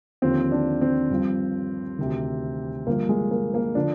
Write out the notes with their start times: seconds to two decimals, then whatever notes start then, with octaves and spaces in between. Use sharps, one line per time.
0.22 D#2 D3 F3 C4
0.52 D4
0.81 C4
1.10 G2 F3
1.99 D2 C3 D#3
2.87 G2 D3 F3 A#3
3.09 G#3
3.31 A#3
3.54 A#3
3.75 D3 F3 D4